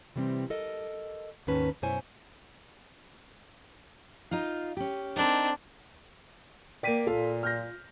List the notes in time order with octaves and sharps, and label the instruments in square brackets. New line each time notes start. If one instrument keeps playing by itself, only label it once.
[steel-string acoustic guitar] C3 E3 G3 A#3 C4
A4 A#4 D#5
D#2 G#2 D#3 C#4 B4 A5
F#2 B2 E4 C5 C#5 G#5
D#4 F4 F5
C#4 G4
[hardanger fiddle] C4 D4 [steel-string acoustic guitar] D#4 A#4
[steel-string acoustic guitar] A#3 D5 [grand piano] G5 B6 D#7
[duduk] A#2 [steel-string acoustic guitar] F4 [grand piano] A4
[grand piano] F6 G6 A#6